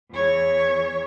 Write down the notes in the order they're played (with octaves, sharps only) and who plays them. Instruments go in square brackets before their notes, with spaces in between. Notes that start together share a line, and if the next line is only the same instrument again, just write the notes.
[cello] E2 C#5